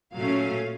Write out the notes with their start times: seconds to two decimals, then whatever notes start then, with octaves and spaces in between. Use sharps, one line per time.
0.15 A#2 F#3 A3 C#4 F5